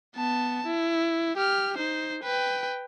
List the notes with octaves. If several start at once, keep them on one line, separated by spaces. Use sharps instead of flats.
B3 A5
E4
G4 F6
D#4 C5
B4 G5